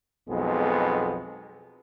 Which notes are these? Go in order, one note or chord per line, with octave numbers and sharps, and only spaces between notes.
B1 F2 G#3 B3